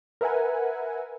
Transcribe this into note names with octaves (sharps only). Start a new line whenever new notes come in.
A#4 B4 E5 F#5 G#5